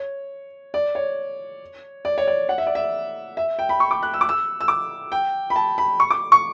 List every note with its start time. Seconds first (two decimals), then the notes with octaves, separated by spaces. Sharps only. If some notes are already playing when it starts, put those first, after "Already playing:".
Already playing: C#5
0.74 D5
0.95 C#5
2.05 D5
2.18 C#5
2.27 D5
2.49 F#5
2.58 E5
2.67 D5
2.75 E5
3.37 E5
3.59 G5
3.69 B5
3.80 C#6
3.91 D6
4.03 F#6
4.14 E6
4.21 D6
4.29 E6
4.61 E6
4.68 D6
5.12 G5
5.50 B5
5.56 A5
5.78 B5
6.00 C#6
6.10 D6
6.32 C#6